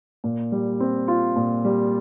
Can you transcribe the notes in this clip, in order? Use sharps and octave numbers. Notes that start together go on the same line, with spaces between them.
A#2
G3
C4
F4
A#2
G3